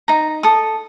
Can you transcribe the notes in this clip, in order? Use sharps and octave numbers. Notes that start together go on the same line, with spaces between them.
D#4 A#5
A4 D#6